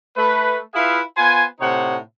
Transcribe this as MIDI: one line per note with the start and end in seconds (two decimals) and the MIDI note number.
0.17 0.58 57
0.17 0.58 71
0.74 1.00 64
0.74 1.00 65
0.74 1.00 68
0.74 1.00 71
0.74 1.00 76
0.74 1.00 77
1.17 1.43 59
1.17 1.43 65
1.17 1.43 72
1.17 1.43 80
1.60 1.97 45
1.60 1.97 48
1.60 1.97 63
1.60 1.97 72
1.60 1.97 73
1.60 1.97 78